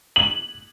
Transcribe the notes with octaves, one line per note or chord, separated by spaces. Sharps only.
F#7